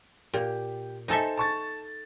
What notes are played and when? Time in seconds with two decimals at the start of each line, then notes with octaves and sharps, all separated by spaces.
0.34 A#2 G4
1.08 D#4 A4 C5 E5 G#5 A5
1.37 A5 C#6 A6